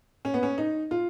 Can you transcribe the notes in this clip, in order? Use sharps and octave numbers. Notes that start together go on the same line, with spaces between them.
C#4
B3
C#4
D#4
F4